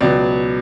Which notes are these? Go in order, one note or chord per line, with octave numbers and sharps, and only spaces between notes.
C#2 B2 F#3 B3 D5